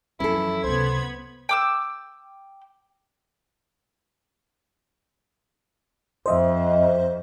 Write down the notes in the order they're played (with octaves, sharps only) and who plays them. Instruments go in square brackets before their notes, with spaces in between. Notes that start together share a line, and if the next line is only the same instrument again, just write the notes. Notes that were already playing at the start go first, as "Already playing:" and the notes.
[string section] F#2 E3 [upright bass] F3 D4 [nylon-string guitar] C#4 A4 [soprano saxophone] E4
[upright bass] C#2 C3 [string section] B3 B5 G#6 [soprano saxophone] C5
[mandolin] G5 D6 E6
[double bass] F2 [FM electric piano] C5 D#5 E5